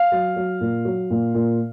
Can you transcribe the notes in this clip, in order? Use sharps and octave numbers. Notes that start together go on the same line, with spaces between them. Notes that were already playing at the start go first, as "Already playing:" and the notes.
Already playing: F5
F#3
F#3
A#2
F#3
A#2
A#2